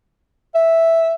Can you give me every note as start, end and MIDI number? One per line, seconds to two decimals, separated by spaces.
0.55 1.14 76